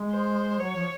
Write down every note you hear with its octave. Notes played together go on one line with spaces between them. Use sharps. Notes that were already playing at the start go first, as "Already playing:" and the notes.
Already playing: G#3
C5
F#3 C#5
F3